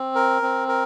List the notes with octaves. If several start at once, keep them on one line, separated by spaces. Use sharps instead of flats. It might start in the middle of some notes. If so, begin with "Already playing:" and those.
Already playing: C4
A#4
C4
A#4